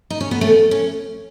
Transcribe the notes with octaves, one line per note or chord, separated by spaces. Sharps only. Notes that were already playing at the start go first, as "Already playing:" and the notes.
D#4
C#4
B3
A3 C#4
C#4